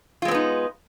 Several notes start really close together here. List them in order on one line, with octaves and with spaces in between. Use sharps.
F4 G#3 C4 B3 D#4